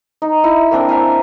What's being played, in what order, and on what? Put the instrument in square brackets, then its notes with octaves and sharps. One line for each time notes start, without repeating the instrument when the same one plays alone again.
[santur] D#4
E4
A#3 C4 D4 A#4
E5 F5 G#5